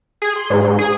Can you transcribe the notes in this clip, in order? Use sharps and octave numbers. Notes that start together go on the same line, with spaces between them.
G#4
C6
G#2
G#2
G#4